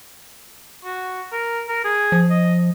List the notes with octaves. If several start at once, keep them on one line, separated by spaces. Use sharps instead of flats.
F#4
A#4
A#4
G#4
F3
D#5